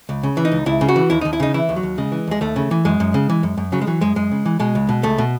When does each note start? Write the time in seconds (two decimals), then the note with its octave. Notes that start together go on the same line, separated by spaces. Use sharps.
0.09 C#2
0.23 C#3
0.37 E3
0.45 D#4
0.52 C#2
0.66 C#2 E4
0.81 C#3
0.89 F#4
0.96 E3
1.10 D#2 E4
1.21 D#2 D#4
1.33 E4
1.40 C#3 D#4
1.54 E3 E4
1.69 D#2
1.76 F#3
1.83 D#2
1.98 C#3 G#3
2.12 E3
2.28 D#2 G#3
2.41 D#2 A3
2.56 C#3
2.71 E3
2.85 F#2 G#3
3.00 F#2
3.14 C#3
3.30 E3
3.43 F#2
3.57 F#2
3.72 C#3 F#3
3.82 G#3
3.87 E3 F#3
4.01 F#2 G#3
4.16 F#2 G#3
4.31 C#3
4.45 E3
4.60 B2 G#3
4.75 C#2
4.89 B2
5.03 C#2 A3
5.18 B2